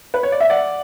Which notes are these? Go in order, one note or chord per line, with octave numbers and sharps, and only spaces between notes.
B4
C#5
D5
E5
D5 F#5